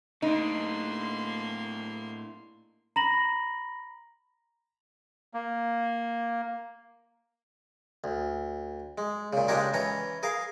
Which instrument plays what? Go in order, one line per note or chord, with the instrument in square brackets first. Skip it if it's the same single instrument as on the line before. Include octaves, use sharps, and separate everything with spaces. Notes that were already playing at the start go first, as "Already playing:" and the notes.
[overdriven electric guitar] A2 D4 [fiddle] A#3 C6 [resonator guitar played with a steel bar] D#4
[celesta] A#5 B5 A#6 F#7
[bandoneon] A#3
[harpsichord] D2
G#3
A#2 C#3
C#3 G#3 D4 G4 A#4 C#5
E3 C#4 C#5 A#5
G#4 A#4 F5